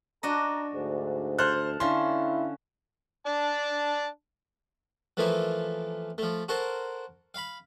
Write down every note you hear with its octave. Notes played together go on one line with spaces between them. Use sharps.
D4 F#4 D#5 A5 A#5
D2 G#2
A4 C5 F6 F#6
D3 C#4 E4 F5 C6
D4 A5
E3 F3 A3 A#3 E4
F3 A3
F#4 A4 A#4 C5
F5 B5